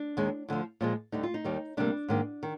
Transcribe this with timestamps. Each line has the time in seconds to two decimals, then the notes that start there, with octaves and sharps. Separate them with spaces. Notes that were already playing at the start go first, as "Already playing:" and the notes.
Already playing: D4
0.17 D#2 D#3 G#3
0.49 D2 D3 F3
0.81 A#2 F3 G#3
1.12 D2 D3 G3 D#4
1.23 F4
1.34 D#4
1.44 D#2 D#3 G3
1.77 D2 C3 G3 A#3 D4
2.08 G#2 D#3 A#3
2.43 D#3